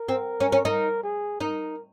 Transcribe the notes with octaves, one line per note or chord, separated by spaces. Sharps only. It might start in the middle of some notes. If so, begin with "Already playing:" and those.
Already playing: A#4
C4
C#4
C#4
D#4 A#4
G#4
D#4 A#4